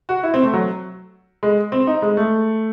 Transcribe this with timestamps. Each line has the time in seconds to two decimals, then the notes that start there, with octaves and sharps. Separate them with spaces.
0.09 F#4
0.23 E4
0.34 C4
0.43 A3
0.54 F#3
1.43 G#3
1.72 C4
1.87 D#4
2.02 G#3
2.17 A3